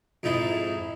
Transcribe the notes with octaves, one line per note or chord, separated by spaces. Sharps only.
F2 G#2 D#4 E4